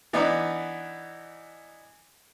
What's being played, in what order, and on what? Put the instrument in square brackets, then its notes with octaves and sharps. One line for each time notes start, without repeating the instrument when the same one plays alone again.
[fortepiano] E3 B3 D4 D#4